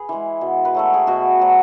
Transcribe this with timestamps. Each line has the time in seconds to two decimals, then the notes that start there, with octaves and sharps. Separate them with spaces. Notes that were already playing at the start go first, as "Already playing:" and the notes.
Already playing: G#4 B4
0.09 E3 G#3
0.41 B2
0.65 B4
0.75 F#3 A3 A4
0.94 G#4
1.07 B2 F#4
1.40 F#3 A3